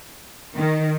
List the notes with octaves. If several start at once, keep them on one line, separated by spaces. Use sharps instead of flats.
D#3